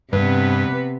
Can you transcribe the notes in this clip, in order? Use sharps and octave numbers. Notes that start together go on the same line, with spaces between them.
G2 C3 B3 B4